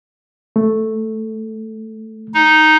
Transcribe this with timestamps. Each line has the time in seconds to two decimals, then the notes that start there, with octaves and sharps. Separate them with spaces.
0.56 A3
2.34 D#4